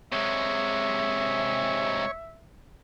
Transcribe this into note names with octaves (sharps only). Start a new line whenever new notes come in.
C3 G#3 C#5 E5